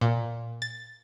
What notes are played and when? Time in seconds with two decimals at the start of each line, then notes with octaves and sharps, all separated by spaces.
0.01 A#2
0.62 A6